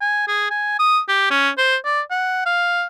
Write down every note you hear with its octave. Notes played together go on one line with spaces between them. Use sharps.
G#5
G#4
G#5
D#6
G4
C#4
C5
D5
F#5
F5